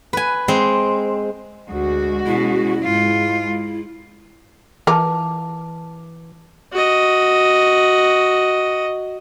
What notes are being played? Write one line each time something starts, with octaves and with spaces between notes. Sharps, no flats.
B4 G#5
G#3 C4
D2 G#3 F#4
B2 C#4 E4
G#2 G#3 F4
E3 F4 A#4 A5 D6
F#4 D#5